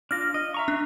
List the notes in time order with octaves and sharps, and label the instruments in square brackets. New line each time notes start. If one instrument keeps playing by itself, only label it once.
[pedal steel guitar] D4 F4 [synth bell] F6 A#6
[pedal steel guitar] D#5
E5 A#5 C#6
[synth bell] D4